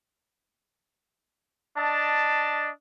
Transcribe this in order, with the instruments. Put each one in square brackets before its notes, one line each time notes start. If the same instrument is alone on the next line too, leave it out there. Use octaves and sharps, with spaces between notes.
[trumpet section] D4 D#5 A5